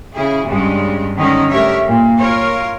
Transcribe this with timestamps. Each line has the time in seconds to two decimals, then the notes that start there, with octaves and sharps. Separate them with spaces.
0.14 C#3 E4 G#4
0.46 G2 C#3 G#3
1.16 D3 D#3 G#3 C#4 D#4
1.50 G2 A3 G4 A#4 C#5 E5
1.85 A#2
2.18 F4 A#4 C#5